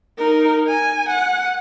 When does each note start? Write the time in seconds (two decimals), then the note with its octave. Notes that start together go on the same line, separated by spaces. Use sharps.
0.18 D#4 A#4
0.67 G#5
1.09 F#5